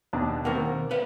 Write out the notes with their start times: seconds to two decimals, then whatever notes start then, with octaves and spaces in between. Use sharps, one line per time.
0.13 D#2 B2 D4
0.45 B2 D#3 A#3 C4 A#4 F#5
0.91 B4 F5 F#5